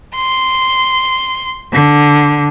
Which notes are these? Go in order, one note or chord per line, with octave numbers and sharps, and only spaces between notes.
C6
D3